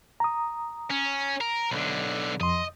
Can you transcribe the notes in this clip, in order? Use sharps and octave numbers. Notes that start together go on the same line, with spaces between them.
A#5 D#6
C#4
A#4
B1 D3
F2 D#5 C6